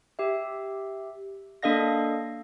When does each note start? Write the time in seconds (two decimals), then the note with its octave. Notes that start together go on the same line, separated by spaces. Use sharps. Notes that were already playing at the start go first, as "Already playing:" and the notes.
0.19 G4 E5
1.63 A#3 D4 A4 D#5 F5 A#6